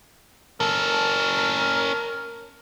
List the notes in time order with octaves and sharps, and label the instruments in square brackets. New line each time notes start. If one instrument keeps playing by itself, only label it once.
[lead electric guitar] C#4 A4 [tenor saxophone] A#4